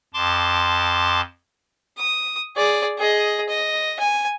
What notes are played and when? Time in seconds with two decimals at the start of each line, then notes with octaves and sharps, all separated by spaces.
0.14 F2 A5 C6 D6
1.98 D#6
2.56 G#4 D5
2.99 G#4 D#5
3.49 D#5
4.00 G#5